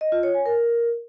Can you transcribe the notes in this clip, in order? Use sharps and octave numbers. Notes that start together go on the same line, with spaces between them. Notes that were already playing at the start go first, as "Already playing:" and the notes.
D#5
F4
C#5
G#5
A#4